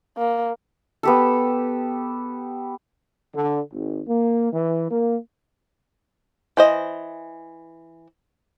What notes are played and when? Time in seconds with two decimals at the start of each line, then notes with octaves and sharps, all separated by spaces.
0.18 A#3
1.03 B3 G4 A4
3.35 D3
3.73 G#1
4.08 A#3
4.53 E3
4.90 A#3
6.57 E3 C5 D#5